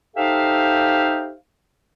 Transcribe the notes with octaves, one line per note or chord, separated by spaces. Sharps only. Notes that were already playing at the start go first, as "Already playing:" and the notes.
D#4 G4 A4 C5 E5 F5